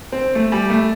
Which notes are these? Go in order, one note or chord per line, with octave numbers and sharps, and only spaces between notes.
C4
A3
G3
A3